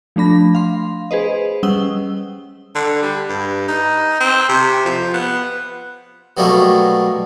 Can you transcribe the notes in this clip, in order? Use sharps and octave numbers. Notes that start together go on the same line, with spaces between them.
F3 A3 D4 B5 A#6
F5 C6
G#4 B4 C5 D#5
G3 C#4 F#5 D#6 E6 G7
D3
G3
G2
D#4
C4
C3
F3
B3
B2 F#3 G3 A3 A#3